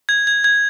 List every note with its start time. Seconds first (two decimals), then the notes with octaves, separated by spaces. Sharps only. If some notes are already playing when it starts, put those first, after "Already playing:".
0.09 G#6
0.27 G#6
0.44 G#6